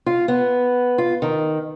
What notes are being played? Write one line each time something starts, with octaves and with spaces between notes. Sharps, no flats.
F4
B3
F4
D#3